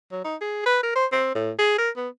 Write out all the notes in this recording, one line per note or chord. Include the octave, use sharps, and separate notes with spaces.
F#3
D#4
G#4
B4
A#4
C5
C4
A2
G#4
A#4
B3